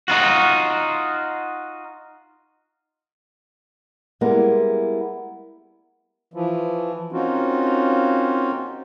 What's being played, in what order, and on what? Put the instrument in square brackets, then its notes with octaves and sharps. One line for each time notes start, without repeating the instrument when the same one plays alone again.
[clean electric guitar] D#4 F4 F#4
[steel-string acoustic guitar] G3 G#3 A#3 B3 E4
[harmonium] E3 F3
A#3 C4 C#4 D#4 F4 F#4